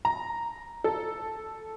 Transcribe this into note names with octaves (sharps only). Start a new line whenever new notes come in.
A#5
A4